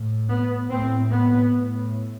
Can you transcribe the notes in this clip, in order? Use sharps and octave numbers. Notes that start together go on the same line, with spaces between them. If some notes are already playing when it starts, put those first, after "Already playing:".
Already playing: A2
B3
A2 C4
B3
A2